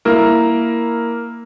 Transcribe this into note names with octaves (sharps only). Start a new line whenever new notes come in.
A#3 E4 A#4